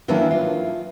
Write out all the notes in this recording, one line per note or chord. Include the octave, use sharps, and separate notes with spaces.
D#3 E3 F#3 A#3 D4 E4
F4